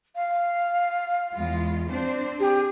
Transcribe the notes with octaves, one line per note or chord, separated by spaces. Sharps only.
F5
E2 G#3 F4
C4 D4 C5
G4 G#4